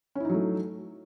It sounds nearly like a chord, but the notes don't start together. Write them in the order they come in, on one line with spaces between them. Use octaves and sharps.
C#4 E4 D#4 F#3 A3